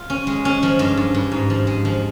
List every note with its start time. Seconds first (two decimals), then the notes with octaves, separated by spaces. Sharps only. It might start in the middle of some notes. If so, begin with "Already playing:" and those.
Already playing: F4
0.10 C#4
0.27 G#3
0.45 C#4
0.63 F3
0.79 G2
0.97 G2
1.14 G2
1.32 G#2
1.50 F3
1.67 G#3
1.85 F3